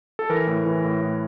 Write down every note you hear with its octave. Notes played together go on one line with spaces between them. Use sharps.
A4
E3 A#4
A2
E3
A2
A2